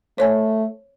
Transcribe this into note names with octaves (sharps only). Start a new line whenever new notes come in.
A3 C5 C#5 G#5